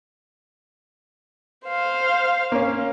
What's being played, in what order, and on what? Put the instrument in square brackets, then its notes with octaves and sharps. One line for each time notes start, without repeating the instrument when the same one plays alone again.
[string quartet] C5 F5
[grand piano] A#3 C#4